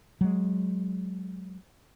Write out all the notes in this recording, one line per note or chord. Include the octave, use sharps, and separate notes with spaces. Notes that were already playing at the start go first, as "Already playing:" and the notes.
F#3 G#3